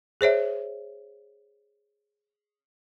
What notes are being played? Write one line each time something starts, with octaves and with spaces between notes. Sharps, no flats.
G#4 C5 C#5 E5